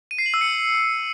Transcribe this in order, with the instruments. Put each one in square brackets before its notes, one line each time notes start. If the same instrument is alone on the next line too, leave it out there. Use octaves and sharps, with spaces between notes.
[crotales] D#7
C7
F#7
E6
C#7